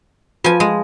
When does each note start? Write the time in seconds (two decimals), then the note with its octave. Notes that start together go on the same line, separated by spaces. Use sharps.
0.44 F3 F4 B4 G#5
0.60 G#3